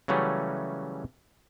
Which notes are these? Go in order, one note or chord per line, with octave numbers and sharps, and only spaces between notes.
C#3 E3 F#3 G3 A3 C#4